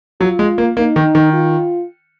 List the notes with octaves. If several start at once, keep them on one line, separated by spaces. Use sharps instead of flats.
F#3 F4
G#3
A#3
A#3 D#4
D#3
D#3
F4